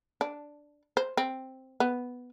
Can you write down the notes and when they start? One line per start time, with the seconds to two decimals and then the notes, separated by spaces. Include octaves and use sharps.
0.21 D4
0.97 C5
1.17 C4
1.80 B3